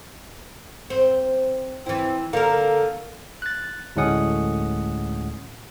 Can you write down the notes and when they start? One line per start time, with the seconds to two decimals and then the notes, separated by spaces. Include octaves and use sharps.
0.90 C4
1.86 E3 C4 E4
2.33 D3 A#3 A#4
3.42 F#6 A6
3.96 D2 A2 G#3 C#4 F#5 D#6